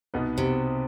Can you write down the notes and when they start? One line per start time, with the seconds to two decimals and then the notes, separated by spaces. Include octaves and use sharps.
0.14 C2 B2 B3 D#4 B4
0.38 C3